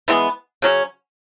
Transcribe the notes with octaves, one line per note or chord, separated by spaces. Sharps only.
E3 G#3 B3
C#3 F#3 C#4